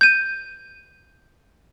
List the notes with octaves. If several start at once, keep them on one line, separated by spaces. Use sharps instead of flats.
G6 D#7